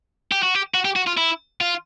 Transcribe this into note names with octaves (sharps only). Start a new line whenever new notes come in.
G4
F#4
G4
F#4
G4
F#4
F4
E4
F4